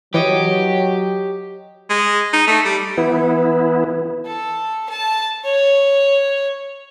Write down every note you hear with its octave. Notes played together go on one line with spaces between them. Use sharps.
E3 F#3 G4 C#5 D#5
G#3
D#4
A3
G3
E3 B3 E4
A4
A5
C#5